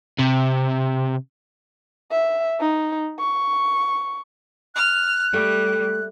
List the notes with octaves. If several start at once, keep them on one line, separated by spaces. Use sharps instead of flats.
C3
E5
D#4
C#6
F6 F#6
G3 A3